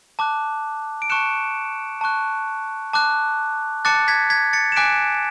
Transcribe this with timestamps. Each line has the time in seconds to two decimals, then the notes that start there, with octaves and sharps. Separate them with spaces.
0.19 A5 D6 F#6
1.02 D7
1.10 A5 C#6 F#6 C#7 E7
2.01 A5 C#6 F#6
2.93 A5 D6 F#6
3.85 A5 D6 F#6 A6 C#7
4.08 G#6 B6
4.30 G#6 B6
4.53 A6 C#7
4.72 E7
4.76 G#5 D6 F#6 B6 D7